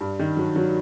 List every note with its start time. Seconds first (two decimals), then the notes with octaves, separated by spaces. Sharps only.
0.01 G2
0.19 D#3
0.37 F#3
0.56 F#3